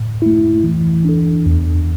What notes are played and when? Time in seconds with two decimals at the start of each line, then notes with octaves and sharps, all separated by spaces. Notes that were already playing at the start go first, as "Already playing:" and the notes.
Already playing: A2
0.22 A3 E4
0.63 E3
1.05 D4 A4
1.46 E2